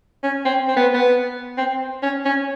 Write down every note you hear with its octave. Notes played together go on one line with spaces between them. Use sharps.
C#4
C4
C4
B3
B3
C4
C#4
C#4